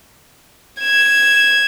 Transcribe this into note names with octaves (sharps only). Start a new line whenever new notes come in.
G#6 E7